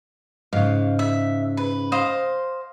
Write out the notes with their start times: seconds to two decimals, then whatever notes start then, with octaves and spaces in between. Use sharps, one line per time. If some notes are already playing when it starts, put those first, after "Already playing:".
0.53 G#2 C#3 F5
0.99 E5
1.57 B4
1.92 C5 D#5 F5